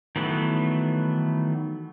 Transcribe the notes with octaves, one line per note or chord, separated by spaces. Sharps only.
D#3 E3 F#3 A3 B3